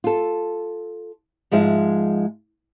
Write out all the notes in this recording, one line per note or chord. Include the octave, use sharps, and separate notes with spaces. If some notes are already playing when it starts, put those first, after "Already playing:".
F4 A4
G#2 F3 G#3 D#5 E5